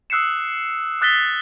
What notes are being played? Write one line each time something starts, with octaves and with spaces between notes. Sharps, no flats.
D#6 E6 F#6 C7 C#7 E7
D#6 F#6 A6 B6 G7